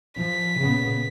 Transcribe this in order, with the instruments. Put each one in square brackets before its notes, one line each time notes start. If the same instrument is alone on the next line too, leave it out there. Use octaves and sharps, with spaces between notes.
[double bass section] F3 [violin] B6
[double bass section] A#2 C#3 B3